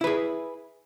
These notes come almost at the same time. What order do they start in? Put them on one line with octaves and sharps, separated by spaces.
E4 B4 G#4